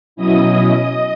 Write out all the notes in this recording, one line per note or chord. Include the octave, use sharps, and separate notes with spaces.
B2 F#3 C#4 E4 D#5 D#6